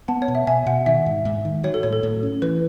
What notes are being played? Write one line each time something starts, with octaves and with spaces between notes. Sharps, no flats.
B3 F#5 A5
C#5
B2
E5
B2 E5 G#5
B2 F#5
D#3 E5
G#2
G#2
D#3
F#3 C#5
A4
A2 C#5
A4
A2
C#4
E3 B4